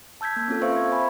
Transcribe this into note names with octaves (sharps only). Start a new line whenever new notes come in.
A5 E6 G6 G#6 B6
A#3
C4 C#4 F4 A4
B4 C5 E5 F5 C#6 E6
G#6
E5 G#5 B5